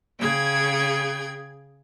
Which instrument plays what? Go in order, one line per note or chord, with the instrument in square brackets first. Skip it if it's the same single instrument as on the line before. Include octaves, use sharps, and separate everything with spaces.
[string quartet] C#3 G#4 G5 G#6